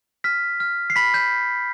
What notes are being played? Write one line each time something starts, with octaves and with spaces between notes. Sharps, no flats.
F6 B6
F6
C7
B5 B6
G6